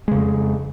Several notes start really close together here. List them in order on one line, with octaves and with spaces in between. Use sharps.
G#3 C#3 F2